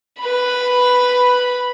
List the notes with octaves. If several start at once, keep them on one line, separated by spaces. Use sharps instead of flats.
B4 B5